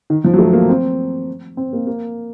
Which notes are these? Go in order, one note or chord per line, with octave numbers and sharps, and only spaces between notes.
D#3
F3
F#3
A3
A#3
C4
C4
A#3
A#3